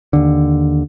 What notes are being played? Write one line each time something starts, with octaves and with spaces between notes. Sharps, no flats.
D#2 D3